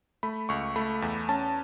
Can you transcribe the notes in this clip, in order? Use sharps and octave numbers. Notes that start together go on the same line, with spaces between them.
A3 B5
C#2 C#6
A3 B5
E2
C#4 A5